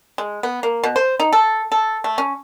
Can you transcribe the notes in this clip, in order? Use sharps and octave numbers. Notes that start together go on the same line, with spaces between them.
G#3
B3
A#3
B2
C5
D#4
A4
A4
A3
C#4